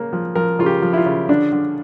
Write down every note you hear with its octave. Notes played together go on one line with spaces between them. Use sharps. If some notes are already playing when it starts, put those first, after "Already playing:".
Already playing: C#3 A#3
F3
F3 A#4
C#3 F4
G4
F3
E4
F4
C#3
D3 D4
D3